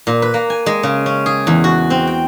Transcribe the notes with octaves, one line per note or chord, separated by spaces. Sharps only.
A#2
B4
A#3
G#5
G#3
C#3
C#4
G#4
E2
F#4
C4
G5